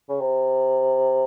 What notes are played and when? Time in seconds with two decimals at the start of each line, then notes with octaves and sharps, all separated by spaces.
0.09 C#3
0.20 C3